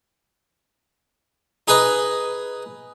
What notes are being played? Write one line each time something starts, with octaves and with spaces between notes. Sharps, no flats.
D#4 G#4 B4 D#5